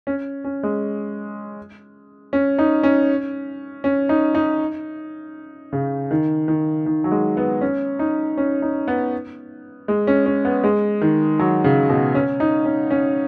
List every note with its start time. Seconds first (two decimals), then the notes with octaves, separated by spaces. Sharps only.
0.07 C#4
0.44 C#4
0.63 G#3
2.33 C#4
2.59 D#4
2.83 C#4
3.84 C#4
4.09 D#4
4.35 D#4
5.73 C#3
6.11 D#3
6.48 D#3
6.86 D#3
7.04 F#3
7.11 G#3
7.37 B3
7.61 C#4
7.99 D#4
8.37 C#4
8.62 D#4
8.88 B3
9.88 G#3
10.07 C#4
10.26 C#4
10.45 B3
10.64 G#3
11.01 D#3
11.39 F#3
11.64 C#3
11.89 B2
12.15 C#4
12.40 D#4
12.65 C#4
12.91 C#4